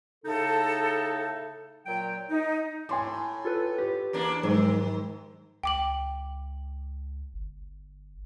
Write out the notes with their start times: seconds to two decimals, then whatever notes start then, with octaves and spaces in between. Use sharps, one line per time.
0.25 A2 C#3 D#4 A4
1.86 A#2 F#3 G5
2.30 D#4
2.89 A2 G#5 C6 D6
3.45 F4 A4 B4
3.78 G4 B4
4.13 E2 A#3 D4
4.43 G#2 D#3 F3 F#3 G#3
5.64 C#2 G5 D6 F#7
7.34 G1